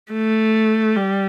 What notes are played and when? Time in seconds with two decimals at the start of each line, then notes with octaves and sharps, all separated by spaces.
0.12 A3
0.96 G3